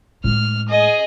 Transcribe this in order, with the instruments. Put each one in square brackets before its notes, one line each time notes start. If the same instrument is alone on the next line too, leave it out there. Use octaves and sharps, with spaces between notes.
[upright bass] A2 G#3 [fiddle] F6
[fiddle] G#4 D#5